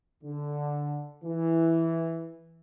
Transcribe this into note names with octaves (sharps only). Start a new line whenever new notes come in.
D3
E3